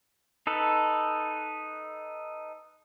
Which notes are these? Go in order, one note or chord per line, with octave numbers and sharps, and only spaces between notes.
D#4 A4 B4